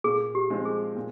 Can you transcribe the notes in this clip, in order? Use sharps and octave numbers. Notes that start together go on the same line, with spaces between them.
A#2 G#4
G4
F3 G#3 C4 F4
G#4
A#2